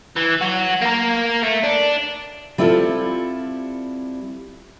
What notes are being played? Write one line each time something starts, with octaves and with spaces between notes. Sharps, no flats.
E3
F#3 F#4
A#3 A#4
A3
D4
G3 C4 E4 F4 A4